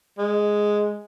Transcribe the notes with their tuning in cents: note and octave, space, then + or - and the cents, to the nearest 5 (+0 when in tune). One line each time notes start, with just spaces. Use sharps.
G#3 +0